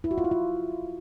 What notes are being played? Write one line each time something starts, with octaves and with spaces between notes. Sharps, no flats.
E4
F#4
F4
E4
F4